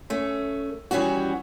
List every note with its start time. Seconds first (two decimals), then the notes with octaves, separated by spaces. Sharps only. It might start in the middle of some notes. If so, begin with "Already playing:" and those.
0.10 A3 C#4
0.91 D#3 E3 G3 C#4 F#4